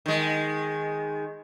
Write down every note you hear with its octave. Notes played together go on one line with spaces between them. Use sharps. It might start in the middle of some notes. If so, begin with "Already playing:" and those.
D#3 G#3